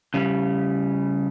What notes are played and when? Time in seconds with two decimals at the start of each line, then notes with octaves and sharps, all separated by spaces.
0.14 C#3 G3